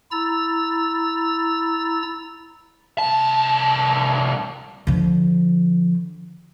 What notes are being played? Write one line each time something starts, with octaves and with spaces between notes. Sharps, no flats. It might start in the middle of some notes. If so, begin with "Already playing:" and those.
E4 A#5 E6 A6
C2 A5
D3 F3